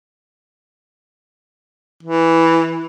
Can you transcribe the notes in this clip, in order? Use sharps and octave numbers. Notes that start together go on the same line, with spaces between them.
E3